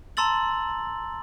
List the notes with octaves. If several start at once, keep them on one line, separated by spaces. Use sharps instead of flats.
A5 A#5 C6 E6 A6 F#7